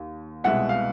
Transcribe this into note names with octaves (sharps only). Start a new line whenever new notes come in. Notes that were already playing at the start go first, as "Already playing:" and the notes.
Already playing: D#2
C2 B2 G#3 E5 F#5
F5